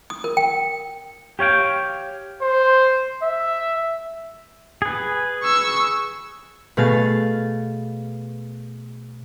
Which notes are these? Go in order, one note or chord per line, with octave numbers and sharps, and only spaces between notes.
D#6
A#4
G5
G4 C#5 F5 G5
C5
E5
G#4 B4
C#6 E6
B2 A3 G#4 F5 A6